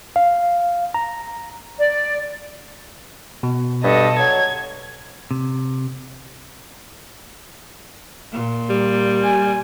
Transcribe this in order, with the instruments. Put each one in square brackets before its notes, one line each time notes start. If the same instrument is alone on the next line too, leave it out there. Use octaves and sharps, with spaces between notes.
[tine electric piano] F5
A#5
[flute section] D5
[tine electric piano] B2
[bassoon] G2 [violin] A4 D#5
[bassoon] F#3 [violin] G#6
[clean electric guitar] C3
[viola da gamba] A#2
[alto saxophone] G3
[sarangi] G#5